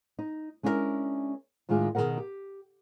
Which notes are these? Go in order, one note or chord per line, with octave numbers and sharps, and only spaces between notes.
D#4
G#3 C#4 D4 E4 F#4 A#4
A2 D#3 G#3 D4 F4 G#4
B2 D#3 G3 G#4 A#4 F#5
G4